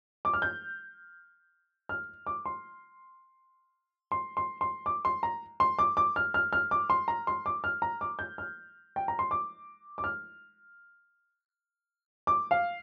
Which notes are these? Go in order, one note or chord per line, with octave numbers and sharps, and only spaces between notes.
D6
F6
G6
F6
D6
C6
C6
C6
C6
D6
C6
A#5
C6
D6
D6
F6
F6
F6
D6
C6
A#5
C6
D6
F6
A#5
D6
G6
F6
G5
A#5
C6
D6
D6
F6
D6
F5